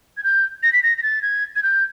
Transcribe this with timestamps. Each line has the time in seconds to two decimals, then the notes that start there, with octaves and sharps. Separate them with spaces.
0.17 G#6
0.24 G6
0.63 A#6
0.73 B6
0.83 A#6
0.98 A#6
1.03 A6
1.22 G#6
1.56 G#6
1.63 G6